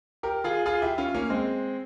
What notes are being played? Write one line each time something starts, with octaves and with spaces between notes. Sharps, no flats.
G4 A#4
F4 G#4
F4 G#4
E4 G4
C#4 F4
A#3 C#4
G#3 C4